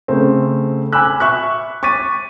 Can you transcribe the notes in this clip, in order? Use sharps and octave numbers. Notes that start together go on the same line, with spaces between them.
C#3 A3 C4
G#5 B5 D6 E6 F#6
E5 C#6 F#6
C#6 D6 A6 B6 D#7